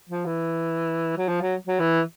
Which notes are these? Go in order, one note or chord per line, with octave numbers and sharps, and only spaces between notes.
F3
E3
F#3
F3
F#3
F#3
E3